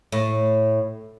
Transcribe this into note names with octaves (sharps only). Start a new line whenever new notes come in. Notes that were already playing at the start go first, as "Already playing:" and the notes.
A2